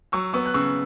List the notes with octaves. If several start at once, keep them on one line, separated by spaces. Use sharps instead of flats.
F#3 C#6 E6
B3 C#6 E6
F#6
C#3 C#6 E6